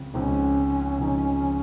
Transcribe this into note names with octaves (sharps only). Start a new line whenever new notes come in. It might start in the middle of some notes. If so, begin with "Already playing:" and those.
Already playing: C#2 C#3 F3 C4
C#2 C#3 F3 C4 C#4 D#4
C#2 C#3 F3 C4 D#4